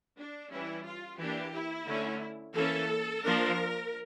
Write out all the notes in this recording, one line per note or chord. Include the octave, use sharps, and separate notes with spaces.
D4
E3 G3 C#4 E4
F4
E3 A#3 D4 G4
E4
D3 A3 C#4
E3 A#3 C#4 A4
F3 A#3 D4 A#4